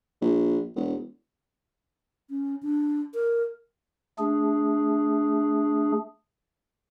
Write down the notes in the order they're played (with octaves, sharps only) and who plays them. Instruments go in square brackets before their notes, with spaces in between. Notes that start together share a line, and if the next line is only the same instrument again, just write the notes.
[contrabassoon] A#1
E1
[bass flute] C#4
D4
A#4
[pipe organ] A3 D4 G#4